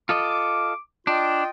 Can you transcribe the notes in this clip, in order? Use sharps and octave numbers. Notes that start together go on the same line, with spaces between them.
F4 A4 D#5 D6
D4 F4 D#5 G5